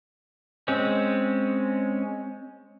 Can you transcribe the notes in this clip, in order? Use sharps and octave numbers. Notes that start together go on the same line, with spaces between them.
G#3 C4 C#4